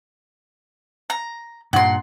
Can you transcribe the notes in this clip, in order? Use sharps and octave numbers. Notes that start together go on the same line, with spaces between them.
A#5
G2 A#2 F#5 C6